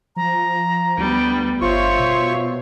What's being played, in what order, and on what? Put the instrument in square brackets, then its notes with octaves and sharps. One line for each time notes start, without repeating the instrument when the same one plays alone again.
[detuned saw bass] F3 [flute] A#5
[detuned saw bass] D2 [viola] G3 B3
[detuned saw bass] G1 [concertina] F4 C#6 [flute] C5 [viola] C#5 E5
[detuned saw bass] B2